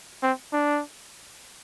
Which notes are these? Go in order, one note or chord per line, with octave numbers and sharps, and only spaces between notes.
C4
D4